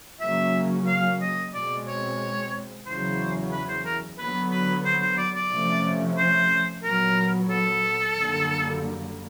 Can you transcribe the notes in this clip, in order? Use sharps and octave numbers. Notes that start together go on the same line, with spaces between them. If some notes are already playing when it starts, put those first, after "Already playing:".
C#3 F#3 A#3 C#4 E5
F5
D#5
B2 G#3 C4 D5
C#5
E2 C#3 F#3 C5
B4
C5
A#4
D3 F#3 B3 B4
B4
C5
C5
D5
D5
C3 F3 A3 C#4
C5
A#2 F#3 B3 A#4
A4
F#2 D3 G3 A#3